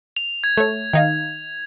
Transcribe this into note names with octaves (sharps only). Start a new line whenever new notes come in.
F7
G#6
A3 C#5
D#3 D#4 F5